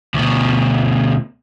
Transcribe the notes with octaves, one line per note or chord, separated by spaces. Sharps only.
D2 B2